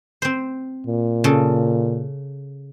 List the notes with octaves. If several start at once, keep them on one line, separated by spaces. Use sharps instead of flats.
C4 C5
A#2
C#3 A4